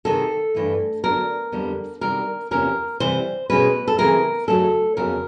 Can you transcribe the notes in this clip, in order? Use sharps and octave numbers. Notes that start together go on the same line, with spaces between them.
C3 D#3 G#3 A4
G2 E3 A3
D3 F#3 B3 D4 A#4
F2 D3 G3 B3 D4
C3 D#3 G3 A#4
E2 C3 F3 A#3 C#4 A#4
C3 E3 G3 C5
B2 G#3 C#4 B4
A4
C#3 E3 G#3 C4 A#4
F2 C#3 F#3 A3 C#4 A4
F2 C#3 F#3 B3 A#4